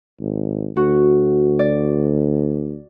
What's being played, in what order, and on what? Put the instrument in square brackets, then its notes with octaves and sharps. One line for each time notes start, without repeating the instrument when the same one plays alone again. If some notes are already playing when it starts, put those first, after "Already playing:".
[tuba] G#1
[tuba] D2 [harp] F#4
[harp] D5